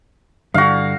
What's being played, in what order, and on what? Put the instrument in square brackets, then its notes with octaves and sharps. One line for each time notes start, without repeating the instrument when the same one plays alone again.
[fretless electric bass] G2 D3 [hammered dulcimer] F#4 F5